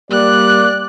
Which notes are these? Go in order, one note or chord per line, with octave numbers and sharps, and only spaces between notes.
G3 A#3 D5 F#6